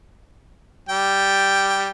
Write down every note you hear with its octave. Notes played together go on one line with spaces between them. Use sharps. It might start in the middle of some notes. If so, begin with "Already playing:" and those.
G3 G5